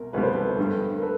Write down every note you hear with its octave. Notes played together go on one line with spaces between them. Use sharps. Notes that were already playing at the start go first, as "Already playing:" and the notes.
Already playing: C2 B2 A#4
C2 B2 G3 B4
C5
A4 B4
G2 D3 G3
A#4
A4 B4